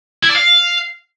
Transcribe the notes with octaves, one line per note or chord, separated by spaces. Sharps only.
E4
D5
F5